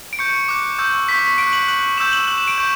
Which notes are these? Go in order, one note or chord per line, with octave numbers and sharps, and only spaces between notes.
D7
C#6 G6 C#7
D6 F#6
C#6 E6 G6
C#6 G6 B6
C#6 F#6 D7
F#7
C#6 F#6 F#7
C#6 E6 G6 E7
F#7
C#6 F#6 F#7
E7
D7
C#6 G6